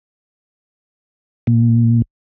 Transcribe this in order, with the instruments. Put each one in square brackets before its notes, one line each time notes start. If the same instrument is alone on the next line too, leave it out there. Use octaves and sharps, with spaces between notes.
[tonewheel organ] A#2